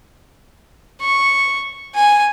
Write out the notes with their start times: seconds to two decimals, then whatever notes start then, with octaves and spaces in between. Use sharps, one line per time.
1.01 C#6
1.95 G#5